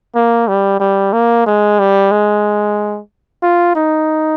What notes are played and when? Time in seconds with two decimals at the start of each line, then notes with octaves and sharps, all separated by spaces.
0.15 A#3
0.48 G3
0.80 G3
1.13 A#3
1.46 G#3
1.79 G3
2.11 G#3
3.42 F4
3.75 D#4